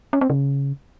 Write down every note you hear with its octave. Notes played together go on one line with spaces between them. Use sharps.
C#4
C4
C#3